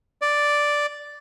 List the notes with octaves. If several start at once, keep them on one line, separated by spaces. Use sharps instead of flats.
D5